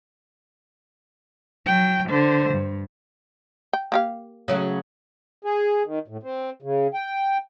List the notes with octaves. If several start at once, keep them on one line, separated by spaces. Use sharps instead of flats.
F#3 G5
D3 C5
G2
G5
A#3 G4 F5
C#3 F#3 A3
G#4
D#3
A2
C4
C#3
G5